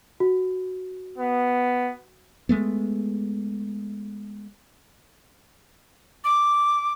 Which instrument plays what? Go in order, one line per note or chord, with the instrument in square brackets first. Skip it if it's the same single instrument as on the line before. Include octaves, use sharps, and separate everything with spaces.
[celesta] F#4
[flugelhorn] B3
[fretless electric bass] G#3 A3 B3
[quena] D6